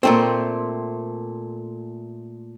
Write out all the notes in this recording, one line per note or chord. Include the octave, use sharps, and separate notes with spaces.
A#2 A3 C4